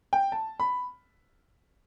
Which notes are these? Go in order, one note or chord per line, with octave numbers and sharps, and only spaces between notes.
G5
A5
B5